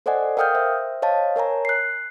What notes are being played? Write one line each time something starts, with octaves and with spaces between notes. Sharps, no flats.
A4 C5 D5 D#5 F#5 G#5
A#4 F5 G5 D#6 F6 G6
C5 E5
C5 C#5 D#5 F5 A5
A#4 C#5 G#5 A#5
F#6 C7